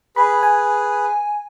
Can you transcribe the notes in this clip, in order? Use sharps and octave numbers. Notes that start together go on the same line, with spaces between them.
G#4 B4 B5
G#5